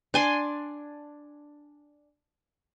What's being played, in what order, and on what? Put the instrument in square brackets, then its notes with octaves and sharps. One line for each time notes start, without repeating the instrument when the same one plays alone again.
[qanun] D4 G#5 C6